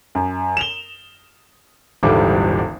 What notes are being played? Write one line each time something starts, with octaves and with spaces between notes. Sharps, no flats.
F#2
E7 F7 G7
D#1 G#1 D3 E3 G3 D6